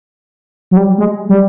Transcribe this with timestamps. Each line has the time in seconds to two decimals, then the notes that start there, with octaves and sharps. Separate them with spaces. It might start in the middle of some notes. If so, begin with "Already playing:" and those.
0.71 F#3
0.77 G3
0.98 G#3
1.29 G3